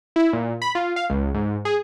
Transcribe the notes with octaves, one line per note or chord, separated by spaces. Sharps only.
E4
A#2
B5
F4
F5
C#2
G#2
G#4